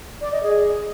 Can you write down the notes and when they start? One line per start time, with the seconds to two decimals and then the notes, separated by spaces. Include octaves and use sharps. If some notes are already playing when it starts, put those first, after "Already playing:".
0.21 D5
0.32 D#5
0.43 G#4